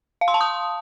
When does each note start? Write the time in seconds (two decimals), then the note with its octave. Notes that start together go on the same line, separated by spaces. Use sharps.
0.21 F5
0.28 C6
0.34 A5
0.41 D#6